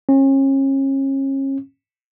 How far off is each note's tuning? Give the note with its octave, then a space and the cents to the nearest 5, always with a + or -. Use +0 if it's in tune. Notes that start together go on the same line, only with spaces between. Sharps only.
C#4 -35